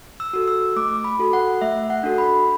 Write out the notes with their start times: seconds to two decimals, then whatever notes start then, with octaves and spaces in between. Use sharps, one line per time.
0.20 E6
0.33 F#4 A4
0.48 E6
0.76 A3 D6
1.04 B5
1.19 F#4 A4
1.33 F#5
1.61 A3 E5
1.90 F#5
2.03 D4 F#4 A4
2.18 B5